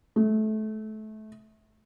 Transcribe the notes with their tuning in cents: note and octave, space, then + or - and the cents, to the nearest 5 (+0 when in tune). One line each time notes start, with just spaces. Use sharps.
A3 -25